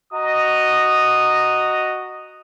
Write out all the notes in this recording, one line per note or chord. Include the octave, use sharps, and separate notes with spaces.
F#4 D#5 A#5 D#6